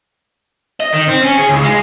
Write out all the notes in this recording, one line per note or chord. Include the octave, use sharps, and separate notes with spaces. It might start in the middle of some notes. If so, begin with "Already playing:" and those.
D#5
D#3
C4
C#4
G#4
C#2
G#3